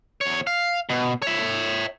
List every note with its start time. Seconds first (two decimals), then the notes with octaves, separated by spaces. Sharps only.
0.21 E2 C#5
0.47 F5
0.89 B2
1.22 C#5 E5